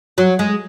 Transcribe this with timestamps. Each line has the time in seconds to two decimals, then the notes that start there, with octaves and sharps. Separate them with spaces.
0.18 F#3
0.39 G#3